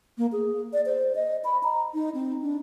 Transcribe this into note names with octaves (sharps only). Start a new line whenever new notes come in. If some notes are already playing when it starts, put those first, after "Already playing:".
A#3
G#4
D5
C5
D#5
B5
A#5
D#4
C4
D4